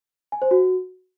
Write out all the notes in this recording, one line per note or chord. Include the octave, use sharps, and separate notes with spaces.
G#5
C5
F#4